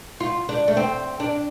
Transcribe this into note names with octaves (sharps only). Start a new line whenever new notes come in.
F4
D4
A3
C4
D4